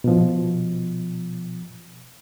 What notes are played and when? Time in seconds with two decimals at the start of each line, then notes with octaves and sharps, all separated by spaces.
0.04 B2 F3